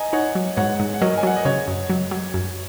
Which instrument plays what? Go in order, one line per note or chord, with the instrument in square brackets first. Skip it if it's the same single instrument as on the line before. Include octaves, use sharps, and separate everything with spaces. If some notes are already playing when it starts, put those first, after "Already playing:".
Already playing: [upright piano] D#5 G#5 A#5
[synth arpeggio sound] D#4 [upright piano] C#5 F#5
[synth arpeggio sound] F#3
[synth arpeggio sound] G#2 [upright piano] C#5 F#5
[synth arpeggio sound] G#2
[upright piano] F#5
[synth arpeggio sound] F#3 [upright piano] A#4 D#5
[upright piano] G#5
[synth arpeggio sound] F#3 [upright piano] F#5
[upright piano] D#5
[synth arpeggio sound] C#3 [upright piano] C#5
[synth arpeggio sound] F#2
F#3
F#3
F#2